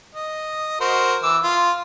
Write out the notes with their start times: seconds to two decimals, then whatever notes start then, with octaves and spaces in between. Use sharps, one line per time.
0.15 D#5
0.80 F#4 A#4 C5
1.23 E3 D6 E6
1.43 F4 C6